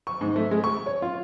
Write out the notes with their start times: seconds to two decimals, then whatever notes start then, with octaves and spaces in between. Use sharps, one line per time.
0.07 C#6
0.21 G#2
0.36 A3
0.51 G#3
0.64 C#6
0.86 C#5
1.02 F4